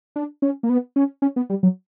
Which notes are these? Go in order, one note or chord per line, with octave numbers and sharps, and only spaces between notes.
D4
C#4
A#3
B3
C#4
C#4
B3
G3
F#3